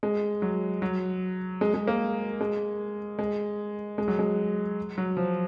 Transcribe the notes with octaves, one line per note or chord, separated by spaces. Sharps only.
G#3
F#3
F#3
G#3
G#3
A#3
G#3
G#3
G#3
F#3
G#3
F#3
F3